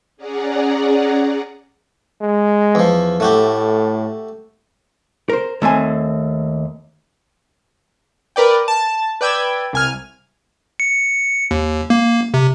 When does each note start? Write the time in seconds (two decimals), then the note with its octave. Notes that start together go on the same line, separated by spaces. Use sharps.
0.17 C#4 G#4 D5 F#5 A#5
2.21 G#3
2.75 E2 F3
3.20 A2 A3 F#4 G4
5.29 A#4 C5
5.62 D#2 A3 C4 G#5
8.36 A#4 B4 D5 G5
8.68 A5
9.21 B4 D5 G5 E6 G#6
9.73 C2 G#5 F6
10.80 C#7
11.51 D#2
11.90 A#3
12.34 C3